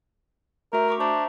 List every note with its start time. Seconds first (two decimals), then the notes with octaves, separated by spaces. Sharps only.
0.73 A3 F#4 A#4 E5
0.88 A#5 C#6 D6
1.00 D4 C5 E5 A#5